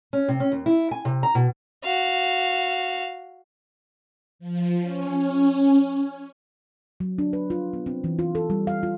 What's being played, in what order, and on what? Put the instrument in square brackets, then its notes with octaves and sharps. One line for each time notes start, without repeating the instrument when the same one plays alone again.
[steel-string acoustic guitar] C#4
C3
C#4
D#2
E4
G#5
C3
A#5
B2
[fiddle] F#4 F5
[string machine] F3
C#4
[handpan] F#3
D4
B4
F4
B3
C4
E3
F4
A4
G3
F5
F4